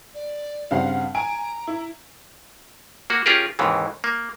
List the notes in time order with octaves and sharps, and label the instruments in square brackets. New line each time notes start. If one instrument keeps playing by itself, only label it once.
[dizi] D5
[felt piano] G2 C#3 C4 [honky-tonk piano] F5 F#5
[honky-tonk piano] G#5 [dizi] A#5 [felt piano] D7
[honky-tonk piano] E4
[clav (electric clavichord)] A#3 F#4
C#4 F4 G4 G#4 A#4
D#2 G#2 C#3 E3
A#3